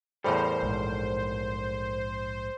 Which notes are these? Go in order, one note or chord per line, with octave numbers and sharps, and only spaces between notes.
E2 A2 G3 A4 A#4 C5 B5
A#1 G#2